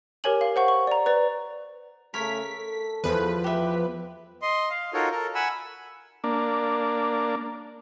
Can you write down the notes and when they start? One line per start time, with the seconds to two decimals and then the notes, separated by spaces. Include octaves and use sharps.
0.24 G4 A#4 C#5 G#5 F#7
0.41 F5
0.56 C5 F#5 C#6
0.68 C#6
0.87 D5 A#5
1.06 B4 D5
2.14 C#3 A3 A#4 C#5 B6
2.56 A4
3.04 E2 F3 B4
3.44 G4 E5
4.42 D#5 C6
4.70 F5
4.94 D#4 F4 F#4 A4 A#4 C#5
5.12 A4 A#4
5.35 F#5 G#5 B5 E6
6.24 A#3 D4